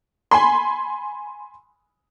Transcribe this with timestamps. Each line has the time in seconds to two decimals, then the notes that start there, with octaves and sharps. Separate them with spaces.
0.31 G#5 B5 C6